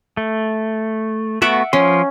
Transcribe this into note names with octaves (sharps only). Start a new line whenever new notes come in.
A3
A3 B3 F#4 E5 F#5 D6
F3 C#4 C6